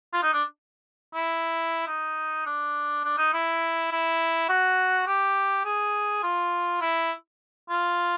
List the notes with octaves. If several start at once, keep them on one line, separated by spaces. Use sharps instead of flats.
F4
D#4
D4
E4
D#4
D4
D4
D#4
E4
E4
F#4
G4
G#4
F4
E4
F4